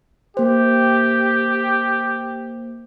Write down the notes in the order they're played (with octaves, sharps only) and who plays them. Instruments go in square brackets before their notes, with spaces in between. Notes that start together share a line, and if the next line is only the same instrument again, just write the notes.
[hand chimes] A#3 C5 [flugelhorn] G4